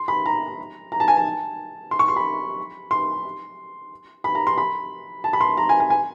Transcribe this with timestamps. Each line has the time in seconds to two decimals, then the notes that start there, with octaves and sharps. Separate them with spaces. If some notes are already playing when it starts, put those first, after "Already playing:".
Already playing: C6
0.08 B5
0.26 A#5
0.92 A#5
1.00 A5
1.08 G#5
1.17 A5
1.91 C6
1.99 C#6
2.08 C6
2.16 B5
2.91 C6
4.24 B5
4.35 A#5
4.47 C6
4.58 B5
5.24 A5
5.33 B5
5.41 C6
5.57 A#5
5.69 G#5
5.80 G#5
5.90 G#5